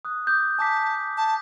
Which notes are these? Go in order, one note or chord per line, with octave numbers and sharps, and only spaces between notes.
D#6 F#6
D6 D#6 G6
G#5 A5 D6 B6
A5